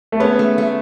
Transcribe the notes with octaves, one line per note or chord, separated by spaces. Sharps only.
A3
G#3 B3 C#4
A3
A3